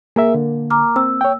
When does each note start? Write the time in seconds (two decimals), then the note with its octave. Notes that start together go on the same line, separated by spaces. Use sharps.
0.16 A#3 G#4 A#4 E5
0.34 D3
0.70 A#5 D6 F6
0.96 C4 E6
1.21 C#5 G5